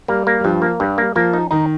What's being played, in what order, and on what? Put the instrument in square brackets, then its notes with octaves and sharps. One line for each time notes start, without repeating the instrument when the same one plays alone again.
[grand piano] G3 [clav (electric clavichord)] A#3
[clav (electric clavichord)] A#3
[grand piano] G3
[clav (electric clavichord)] G2 [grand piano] F3
[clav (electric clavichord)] A#3
[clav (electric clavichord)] G2 [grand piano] G3
[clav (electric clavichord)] A#3
[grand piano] F3 [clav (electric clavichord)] A#3
[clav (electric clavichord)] D#4
[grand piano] D#3 [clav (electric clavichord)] D#4